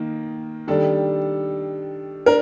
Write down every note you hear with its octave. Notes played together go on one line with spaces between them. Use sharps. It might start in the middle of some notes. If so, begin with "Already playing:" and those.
Already playing: D#3 A#3 D#4
D#3 G3 D4 A4
D4 A#4